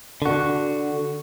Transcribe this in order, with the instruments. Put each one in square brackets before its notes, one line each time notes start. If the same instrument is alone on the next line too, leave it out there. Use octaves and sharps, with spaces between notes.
[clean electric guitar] D3 F#4